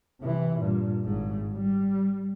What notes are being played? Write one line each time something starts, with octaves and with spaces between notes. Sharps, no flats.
C3 E3
G2 A#2
G#1 G#2
G3